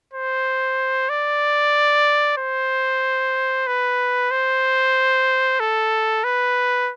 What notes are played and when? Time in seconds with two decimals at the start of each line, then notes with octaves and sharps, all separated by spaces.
0.14 C5
1.09 D5
2.38 C5
3.67 B4
4.31 C5
5.60 A4
6.24 B4